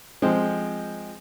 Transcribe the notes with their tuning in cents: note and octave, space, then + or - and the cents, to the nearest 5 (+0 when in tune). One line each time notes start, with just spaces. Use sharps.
F3 +0 G#3 +0 C4 +0